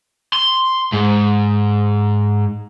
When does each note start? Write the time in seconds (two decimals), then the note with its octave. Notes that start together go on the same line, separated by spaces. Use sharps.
0.33 C6
0.93 G#2